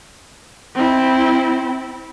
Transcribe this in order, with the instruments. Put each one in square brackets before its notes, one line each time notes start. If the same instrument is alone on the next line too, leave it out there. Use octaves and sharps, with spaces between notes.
[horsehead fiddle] C4 E4